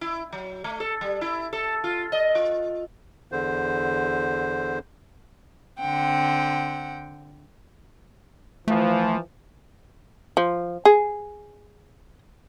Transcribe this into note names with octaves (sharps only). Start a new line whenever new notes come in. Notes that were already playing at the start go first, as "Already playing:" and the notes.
E4
F#3
A3
A4
G3
E4
A4
F4
D#5
F4
E2 D3 C5
D3 C4 F#5 G5
E3 F3 A3
F3
G#4